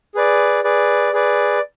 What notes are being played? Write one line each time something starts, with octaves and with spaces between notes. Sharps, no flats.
G#4 B4 D5
G#4 B4 D5
G#4 B4 D5